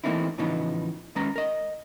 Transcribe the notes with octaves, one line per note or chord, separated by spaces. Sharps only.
E3 A3 A#3 C4 D#4 E4
A2 C#3 E3 F3 B3 D#4
D#2 G#3 C#4 B4 A#5
A#4 D#5